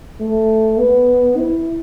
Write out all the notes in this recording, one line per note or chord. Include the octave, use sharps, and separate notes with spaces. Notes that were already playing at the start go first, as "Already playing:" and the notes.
A3
B3
E4